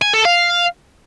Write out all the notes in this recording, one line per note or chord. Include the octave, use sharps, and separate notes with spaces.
G#5
A4
F5